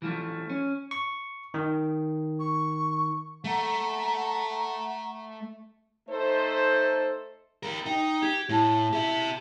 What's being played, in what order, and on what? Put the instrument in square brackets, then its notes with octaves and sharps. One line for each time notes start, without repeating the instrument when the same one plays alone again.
[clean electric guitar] E3 F3 A3
C#4
[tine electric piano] C#6
D#3
[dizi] C#6
[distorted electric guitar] A3 [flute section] F#5 A#5
[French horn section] A3 D#4 A4 C5
[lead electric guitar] G4 A#4
[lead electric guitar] D#4 [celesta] G5
[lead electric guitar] G4 [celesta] G#6
[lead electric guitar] A2 [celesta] E4 A5
[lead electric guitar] G4 E5